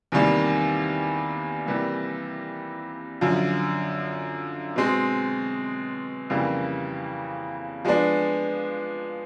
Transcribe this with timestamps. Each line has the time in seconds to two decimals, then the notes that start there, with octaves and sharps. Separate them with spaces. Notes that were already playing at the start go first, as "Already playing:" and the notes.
0.12 E2 C3 D#3 G3 A#3
1.66 C3 E3 G3 A#3
3.21 F#2 D3 F3
4.76 B2 G#3 C4
6.30 F2 C#3 E3 G3 A#3
7.85 F3 G#3 B3 D4